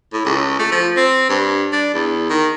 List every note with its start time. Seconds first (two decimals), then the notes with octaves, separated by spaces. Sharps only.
0.13 A2
0.25 C#2
0.59 A3
0.72 F3
0.97 C4
1.30 G2
1.73 D4
1.94 E2
2.30 D#3